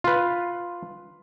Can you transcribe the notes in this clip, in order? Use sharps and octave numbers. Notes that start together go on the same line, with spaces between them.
F4 B4